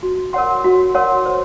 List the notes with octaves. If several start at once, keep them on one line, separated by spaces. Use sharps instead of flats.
F#4
A#4 C#5 F#5 C6
F#4
A#4 C#5 F#5 C6
C5